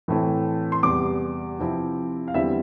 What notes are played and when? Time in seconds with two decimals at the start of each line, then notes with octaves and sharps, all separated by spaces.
0.08 A2 E3 A3 C4 E4
0.72 C6
0.83 E2 C3 G3 D6
1.59 C3 F3 C4 E4
2.28 F5
2.34 E2 D3 G3 C4 E4 E5